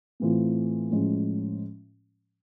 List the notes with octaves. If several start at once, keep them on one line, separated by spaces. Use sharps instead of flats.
A2 E3 A3 C4 F4
A2 F3 G#3 C#4